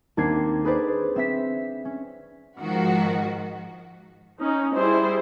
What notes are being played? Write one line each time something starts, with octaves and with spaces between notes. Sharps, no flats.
D#2 C4 D4 G#6 C7
G#4 B4 C5 D5
C4 E5 B6
C#4
G#2 D#3 F3 F#4
C#4 D#4
G3 E4 G#4 C5